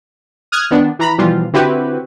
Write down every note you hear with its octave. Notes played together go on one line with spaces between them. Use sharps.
D#6 F6 F#6 G#6
D#3 B3 D4
E3 A#5 B5
B2 E3 F3 G3 F4
D3 C4 E4 F#4 G4 B4